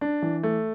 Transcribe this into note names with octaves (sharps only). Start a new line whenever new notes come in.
D4
E3
A3